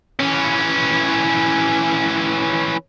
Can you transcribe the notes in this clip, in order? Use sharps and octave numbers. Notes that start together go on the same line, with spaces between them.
E3 C#4